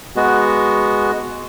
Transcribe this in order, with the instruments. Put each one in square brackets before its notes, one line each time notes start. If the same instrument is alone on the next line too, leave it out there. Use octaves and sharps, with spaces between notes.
[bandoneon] G#3 B3 F#4